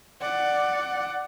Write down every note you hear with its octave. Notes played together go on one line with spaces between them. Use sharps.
D5 F#5